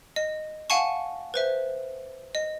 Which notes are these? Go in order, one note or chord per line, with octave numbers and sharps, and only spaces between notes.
D#5
F5 F#5 G#5 A5 C#6
B4 C5 E5
D#5